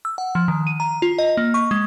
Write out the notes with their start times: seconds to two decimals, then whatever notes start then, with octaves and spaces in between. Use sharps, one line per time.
0.05 E6
0.18 F#5
0.35 F3
0.48 D#3
0.67 D#7
0.80 A#5
1.02 F4
1.18 D#5
1.37 A#3
1.54 C#6
1.71 G#3